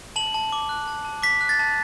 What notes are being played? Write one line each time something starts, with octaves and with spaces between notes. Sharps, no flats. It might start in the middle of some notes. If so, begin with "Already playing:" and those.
A5 F#7
A5
D6
F#6
A5
A5
D6 B6
F#6
A6
A5